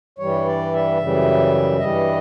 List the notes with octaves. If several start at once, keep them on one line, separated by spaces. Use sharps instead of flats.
G2 E3 G3 C#5
D5
E5
F#2 C#3 E3 G3
G2 E3 G3 D#5